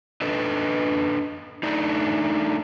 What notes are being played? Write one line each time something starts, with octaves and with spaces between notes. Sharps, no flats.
D4 A4 B4 D#5
A3 D4 D#4